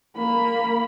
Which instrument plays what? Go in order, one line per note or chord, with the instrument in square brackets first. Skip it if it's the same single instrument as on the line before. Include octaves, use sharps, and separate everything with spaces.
[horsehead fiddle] A#3 B5